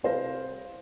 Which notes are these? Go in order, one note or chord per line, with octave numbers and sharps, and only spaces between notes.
C2 B4 C5 F5 A#6